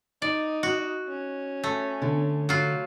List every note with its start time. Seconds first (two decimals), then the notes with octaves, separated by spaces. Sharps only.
0.22 D#4 D5
0.63 F#4
1.08 C#4
1.64 A3
2.02 D3
2.49 F#3 F4